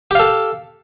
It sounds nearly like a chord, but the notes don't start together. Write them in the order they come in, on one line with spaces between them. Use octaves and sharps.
G4 F5 A4